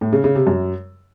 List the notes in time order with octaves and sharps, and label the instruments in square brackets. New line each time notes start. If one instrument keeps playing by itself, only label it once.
[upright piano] A2
C#3
C#3
C3
F#2